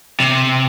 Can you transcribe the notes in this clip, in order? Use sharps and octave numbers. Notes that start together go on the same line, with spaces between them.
C3